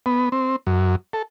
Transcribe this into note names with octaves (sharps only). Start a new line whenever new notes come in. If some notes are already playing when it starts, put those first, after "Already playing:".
B3
C4
F#2
A4